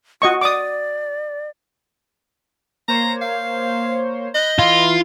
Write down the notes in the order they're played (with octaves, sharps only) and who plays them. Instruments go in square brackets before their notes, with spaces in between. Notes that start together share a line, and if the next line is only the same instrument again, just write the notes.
[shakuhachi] F4 [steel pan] F#4 D#5 C#6
[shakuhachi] D5 [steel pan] D6 D#6
[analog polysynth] A#3 C5 C#5 [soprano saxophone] A#5
[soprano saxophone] F5
[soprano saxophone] D#5 [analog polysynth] B5 F#6 G6
[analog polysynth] E3 E4 [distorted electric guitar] F4